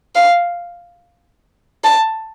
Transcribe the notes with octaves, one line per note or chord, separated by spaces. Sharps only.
F5
A5